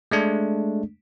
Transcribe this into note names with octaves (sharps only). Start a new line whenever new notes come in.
G#3 A3 D4